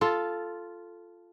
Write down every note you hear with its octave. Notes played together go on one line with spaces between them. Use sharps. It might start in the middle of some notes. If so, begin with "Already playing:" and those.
F4 A4